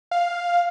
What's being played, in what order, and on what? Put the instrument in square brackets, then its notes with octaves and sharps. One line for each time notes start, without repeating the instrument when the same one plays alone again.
[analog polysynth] F5